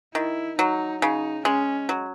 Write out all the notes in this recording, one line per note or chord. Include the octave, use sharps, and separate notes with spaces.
D#3 E4
F#3 D#4
C#3 D#4
G#3 C#4
F#3